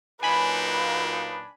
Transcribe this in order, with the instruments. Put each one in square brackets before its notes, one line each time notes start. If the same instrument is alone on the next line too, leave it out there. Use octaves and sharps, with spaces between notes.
[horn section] A#2 F#3 D#4 [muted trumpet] D4 [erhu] B4 [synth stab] G#5 B5